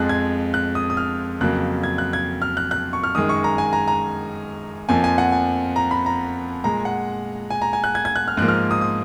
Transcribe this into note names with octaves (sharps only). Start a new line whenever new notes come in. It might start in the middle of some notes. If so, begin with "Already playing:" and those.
Already playing: F2 F3 G#3 F#6
G#6
F#6
D#6
D#6
F6
F2 C#3 F#3 A#3 F#6
G#6
F#6
G#6
F6
F#6
F#6
C#6
F6
F#2 D#3 G#3 D#6
C#6
A#5
G#5
A#5
A#5
F2 F3 A#3 G#5
G#5
F#5
G#5
A#5
B5
A#5
A#2 G#3 A#5
F#5
G#5
A#5
G#5
F#6
G#6
G#6
F#6
F6
G#2 F3 A#3 F#6
F6
D#6
D#6